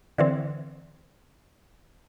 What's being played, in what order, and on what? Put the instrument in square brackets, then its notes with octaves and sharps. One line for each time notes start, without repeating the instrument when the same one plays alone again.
[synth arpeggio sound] D3 E3 C4